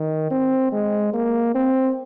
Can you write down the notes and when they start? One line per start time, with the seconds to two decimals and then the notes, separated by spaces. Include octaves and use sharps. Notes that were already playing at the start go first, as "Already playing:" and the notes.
Already playing: D#3
0.31 C4
0.73 G#3
1.14 A#3
1.55 C4